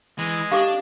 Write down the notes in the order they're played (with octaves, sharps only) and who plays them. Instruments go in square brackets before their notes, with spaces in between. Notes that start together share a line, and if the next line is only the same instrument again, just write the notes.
[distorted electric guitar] E3 [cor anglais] G#3
[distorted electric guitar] D4 [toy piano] G4 A4 D6 [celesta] F5